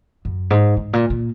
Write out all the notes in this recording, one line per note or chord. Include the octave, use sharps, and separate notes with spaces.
F#2
G#2
G#2
A#2
A#2